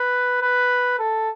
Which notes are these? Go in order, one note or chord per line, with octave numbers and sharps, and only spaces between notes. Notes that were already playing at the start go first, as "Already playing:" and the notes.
Already playing: B4
B4
A4